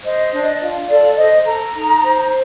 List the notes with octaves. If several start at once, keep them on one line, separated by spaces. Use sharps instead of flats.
C5 D#5
D4
F4
A4 D5
C5 D#5
A4 A#5
D#4
C5